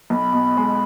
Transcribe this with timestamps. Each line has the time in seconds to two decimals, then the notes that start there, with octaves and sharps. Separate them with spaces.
0.10 B1 B5
0.33 B2
0.57 G#3